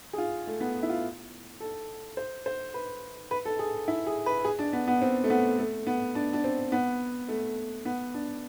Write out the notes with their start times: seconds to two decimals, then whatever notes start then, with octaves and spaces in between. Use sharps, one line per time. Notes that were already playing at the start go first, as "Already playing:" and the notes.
0.13 G#4
0.18 F4
0.47 A3
0.60 B3
0.83 E4
0.90 F4
1.60 A4
2.17 C5
2.46 C5
2.74 B4
3.31 B4
3.45 A4
3.59 G#4
3.88 E4
4.07 G#4
4.26 B4
4.45 G#4
4.59 D4
4.73 B3
4.88 B3
5.02 C4
5.24 A3
5.30 B3
5.59 A3
5.87 B3
6.15 D4
6.33 D4
6.44 C4
6.72 B3
7.28 A3
7.85 B3
8.14 D4